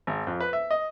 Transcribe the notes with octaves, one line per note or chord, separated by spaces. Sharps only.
G#1
F2
B4
E5
D#5